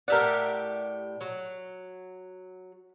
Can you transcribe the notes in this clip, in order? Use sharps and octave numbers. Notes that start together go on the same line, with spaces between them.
A2 G4 A#4 D5 E5 F#5
F#3